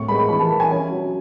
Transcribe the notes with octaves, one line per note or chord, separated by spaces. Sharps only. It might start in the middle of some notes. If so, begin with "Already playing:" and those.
Already playing: A2 C#6
G#3 B5
E3 B5
A5
E3
G#5
C#4
F#3